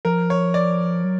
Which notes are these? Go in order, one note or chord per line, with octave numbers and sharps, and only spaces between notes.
F3 A#4
C#5
D5
F#3